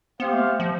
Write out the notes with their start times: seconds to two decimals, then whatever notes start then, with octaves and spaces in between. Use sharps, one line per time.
0.20 B3 C4 G4 C5 F5
0.33 A3
0.60 F3